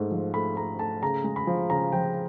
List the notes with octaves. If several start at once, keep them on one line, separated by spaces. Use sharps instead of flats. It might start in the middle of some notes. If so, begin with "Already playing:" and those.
Already playing: G#2 A3
F3
A3 B5
A3 A#5
A3 A5
C#3 A#5
G#3
B5
F3
C#3 A#5
F3 G5